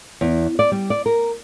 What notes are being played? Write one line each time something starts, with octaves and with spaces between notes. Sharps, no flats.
E2
D5
G3
D5
A#4